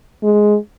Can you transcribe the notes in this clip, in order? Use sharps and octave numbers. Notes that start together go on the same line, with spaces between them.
G#3